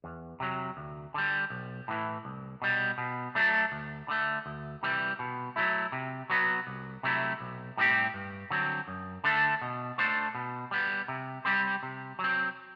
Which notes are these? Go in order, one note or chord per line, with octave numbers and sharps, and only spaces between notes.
E2
C3 F#3
D2
D3 G3
B1
A2 E3
C2
B2 G3
B2
F#3 A3 D4
D2
D3 A3
D2
C3 E3 G3
B2
F#3 A3 E4
C3
F#3 B3 F#4 B4
C2
C3 F#3 A3 E4
B1
A2 G3 C4 G4
G2
D3 F#3 C4
F#2
D3 A3 D4 A4
B2
A3 D4 A4 C5
B2
G3 B3
C3
G3 C4 G4 C5
C3
F#3
C4